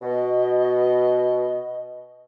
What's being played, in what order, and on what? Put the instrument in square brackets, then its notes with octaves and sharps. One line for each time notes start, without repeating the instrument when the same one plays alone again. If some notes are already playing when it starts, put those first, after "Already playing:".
[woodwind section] B2 [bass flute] D#5